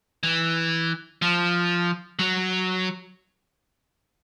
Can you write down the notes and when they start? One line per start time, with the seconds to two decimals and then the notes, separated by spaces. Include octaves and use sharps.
0.23 E3
1.22 F3
2.19 F#3